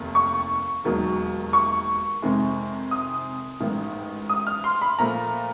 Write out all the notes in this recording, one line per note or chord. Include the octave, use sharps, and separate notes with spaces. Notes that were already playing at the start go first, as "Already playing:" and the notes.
Already playing: F1 D#2 D#3
C#6
E1 D#2 D#3 F#3
C#6
F2 C3 D#3 G#3
D#6
A1 G#2 D#3
D#6
F6
C6
B5
A#2 F3 A3 A#5